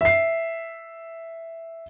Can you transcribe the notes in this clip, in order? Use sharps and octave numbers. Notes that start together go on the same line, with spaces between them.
E5 C7